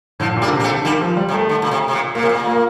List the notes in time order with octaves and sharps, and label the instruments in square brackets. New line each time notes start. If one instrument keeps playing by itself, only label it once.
[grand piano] A2 [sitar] D3 F3
[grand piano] A#2
[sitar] G3 A#3
[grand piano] D3
C3
[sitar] A#3
A3 C4
[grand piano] D3
[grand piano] D#3 [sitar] G3 A#3
[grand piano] F3
G3
[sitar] C3
[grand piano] A3
[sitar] D3
A#2
C3
C3
A#2
[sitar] A#2 [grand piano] A#3
[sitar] C3
A#2
[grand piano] A#3